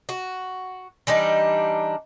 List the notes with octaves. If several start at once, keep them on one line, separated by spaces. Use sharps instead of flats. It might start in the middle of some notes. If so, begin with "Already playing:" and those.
F#4
E3 G3 D4 D#4